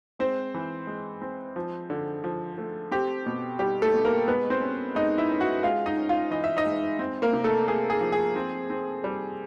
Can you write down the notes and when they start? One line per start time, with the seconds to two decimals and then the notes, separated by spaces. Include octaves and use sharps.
0.19 G#3 C4 C5
0.54 E3
0.87 G#3
1.22 C4
1.56 F3
1.90 D3
2.24 F3
2.58 A3
2.91 C4 G4
3.26 B2
3.59 G3 G4
3.82 A3 A4
3.94 B2
4.05 A#3 A#4
4.28 G#3 B3 B4
4.50 C4 C5
4.62 C#4
4.95 G#3 D#4 D#5
5.18 E4 E5
5.30 C#4
5.40 F#4 F#5
5.63 G#3 F4 F5
5.86 D#4 D#5
5.97 C#4
6.09 F4 F5
6.31 E3 D#5
6.44 E5
6.57 D#4 D#5
6.65 G#3
6.99 C4
7.22 A#3 A#4
7.33 C3
7.44 A3 A4
7.67 A3 G#4
7.90 G#4
8.01 F3
8.12 G#4
8.36 C4
8.70 C4
9.04 G3